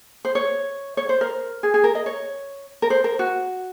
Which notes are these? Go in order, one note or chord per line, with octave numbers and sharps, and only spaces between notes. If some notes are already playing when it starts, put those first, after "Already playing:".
C5
C#5
C#5
C5
A#4
G#4
G#4
A#4
D#5
C#5
A#4
C5
A#4
F#4